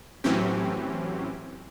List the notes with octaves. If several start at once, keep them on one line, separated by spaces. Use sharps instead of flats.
A2 E3 F#3 C4 C#4 G4